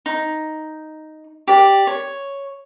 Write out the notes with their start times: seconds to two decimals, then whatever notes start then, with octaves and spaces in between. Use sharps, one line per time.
0.06 D#4
1.48 G4 D5
1.87 C#5